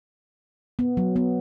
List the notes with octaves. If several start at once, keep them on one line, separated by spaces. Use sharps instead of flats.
B3
F#3
B3